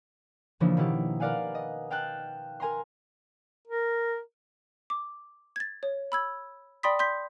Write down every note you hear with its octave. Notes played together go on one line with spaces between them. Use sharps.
C#3 E3 F3 A#3 D4 D#4
B2 D#3 D#4 E4 G4
A#4 B4 D5 F5 F#5 G#5
D#5
F5 G5 A5 F#6
A#4 G#5 A#5 C6
A#4
D6
G#6 A6
C#5
B5 E6 G#6
D5 G5 B5 C6 D#6 B6
C6 G6 B6